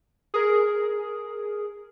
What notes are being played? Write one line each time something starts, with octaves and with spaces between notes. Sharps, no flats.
G#4 A#4